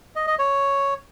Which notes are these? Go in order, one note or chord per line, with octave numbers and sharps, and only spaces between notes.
D#5
D#5
C#5